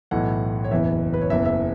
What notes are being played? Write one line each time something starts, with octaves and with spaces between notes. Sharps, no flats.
B1 A2 E3 F#5
C#5
F#1 E2 E3 E5
B4
C#5
F#1 E2 E3 E5
E5